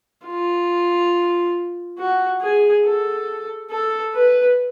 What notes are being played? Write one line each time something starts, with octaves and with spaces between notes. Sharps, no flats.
F4
F#4
G#4
A4
A4
B4